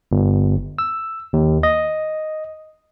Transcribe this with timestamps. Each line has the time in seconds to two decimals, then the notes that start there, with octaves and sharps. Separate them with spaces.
0.12 G1
0.79 E6
1.33 D#2
1.63 D#5